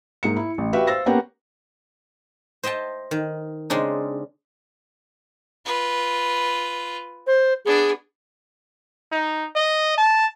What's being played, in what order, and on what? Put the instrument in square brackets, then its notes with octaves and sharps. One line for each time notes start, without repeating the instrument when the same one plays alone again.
[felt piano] G#2 A#3 C#7
E4
A1
F#4 G4 B4 E5 F5 G5
C5 F5 E6 A6 A#6
A#3 B3 C#4 G4 F#5 G5
[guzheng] C5 D#5 E5 G5 A5
D#3
C#3 G#3 C4 D4 D#4
[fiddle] F4 B4
[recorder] C5
[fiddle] B3 D4 [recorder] G#4
[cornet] D#4
D#5
A5